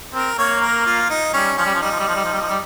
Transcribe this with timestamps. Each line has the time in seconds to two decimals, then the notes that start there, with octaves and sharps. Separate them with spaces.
0.14 C4 A#4
0.38 A#3 C#5
0.61 A#4
0.86 F4
1.10 D#4
1.33 G3 C#4
1.57 F3 C#4
1.66 G3
1.74 F3
1.81 G3 D#4
1.91 F3
1.99 G3
2.08 F3
2.16 G3
2.24 F3
2.33 G3
2.41 F3
2.49 G3